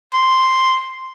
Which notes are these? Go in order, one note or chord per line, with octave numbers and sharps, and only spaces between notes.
C6